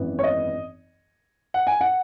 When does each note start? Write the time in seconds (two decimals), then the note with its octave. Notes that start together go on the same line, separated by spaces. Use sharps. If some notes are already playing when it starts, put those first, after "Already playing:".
Already playing: G#1 F#2 E3 B3
0.19 C#5
0.23 D#5
1.54 F#5
1.67 G#5
1.81 F#5